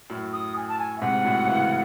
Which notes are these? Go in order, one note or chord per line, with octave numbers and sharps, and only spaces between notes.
F#2 A2
D#6
G#5
A5
G#5
E5
G#2 C3 F#5
F#2 A2
C#3 E3